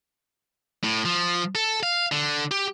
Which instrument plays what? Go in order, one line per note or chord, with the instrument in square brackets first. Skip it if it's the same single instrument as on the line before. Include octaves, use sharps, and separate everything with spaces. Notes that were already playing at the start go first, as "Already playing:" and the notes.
[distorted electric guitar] A2
F3
A4
F5
D3
G4